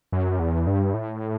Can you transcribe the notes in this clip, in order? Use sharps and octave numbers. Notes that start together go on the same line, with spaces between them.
F#2
E2
G2
A2